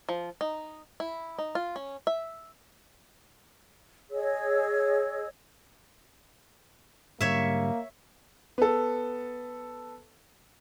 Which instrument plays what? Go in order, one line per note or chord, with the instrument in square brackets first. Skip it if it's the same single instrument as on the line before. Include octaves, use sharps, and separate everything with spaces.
[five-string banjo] F3
D#4
E4
D#4
F4
C#4
E5
[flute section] G#4 C#5 D#5 E6
[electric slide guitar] G#2 D3 G3 [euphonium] A#3 [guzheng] C#5 E5
[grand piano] B3 A4